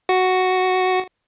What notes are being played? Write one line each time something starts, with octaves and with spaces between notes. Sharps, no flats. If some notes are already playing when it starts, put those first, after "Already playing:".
F#4